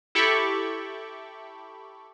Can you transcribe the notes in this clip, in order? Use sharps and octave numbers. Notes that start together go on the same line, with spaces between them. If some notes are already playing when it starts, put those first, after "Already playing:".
E4 G4 A4 B5 C#6 D6